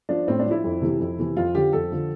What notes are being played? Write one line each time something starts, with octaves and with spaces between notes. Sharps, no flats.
F3 D4
A2 C4
D4
F3
E4
F2
C3 E3
F2
C3 E3
F2 F4
D3 F3 G4
F2 A4
D3 F3